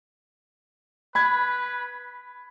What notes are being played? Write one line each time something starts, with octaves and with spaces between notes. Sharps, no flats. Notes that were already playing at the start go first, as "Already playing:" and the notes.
B4 B5 G#6